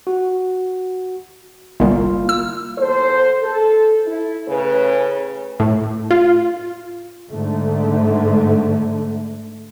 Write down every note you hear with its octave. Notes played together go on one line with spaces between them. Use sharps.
F#4
G1 C2 A#3 E4 F4
E6
E2 A4 C5
A4
E4
A2 C#3 B4
A2
F4
G#2 D3 A3